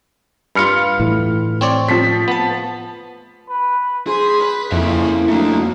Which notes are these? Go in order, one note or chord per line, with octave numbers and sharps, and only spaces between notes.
G2 F4 B5 F6 C#7
A2 E3
C4 C#5 D5
F3 B6
B3 A5
B4
G#4 C5 B6
B4
F2 C#3 A#3 C#4 E4 E5
F#3 A3 D4 D#4